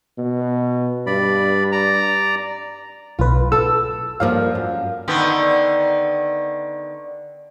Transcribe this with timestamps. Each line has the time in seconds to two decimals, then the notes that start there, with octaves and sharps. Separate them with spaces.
0.18 B2
1.06 G2 D5 B5
1.72 D5 A#5
3.19 B1 F4 B4
3.52 A4 E6
4.20 G2 F3 A#3 F5
4.55 F#2
5.08 D3 D#3 B3